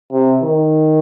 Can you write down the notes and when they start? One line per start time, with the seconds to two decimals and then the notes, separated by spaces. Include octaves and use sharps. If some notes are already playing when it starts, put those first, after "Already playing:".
0.12 C3
0.43 D#3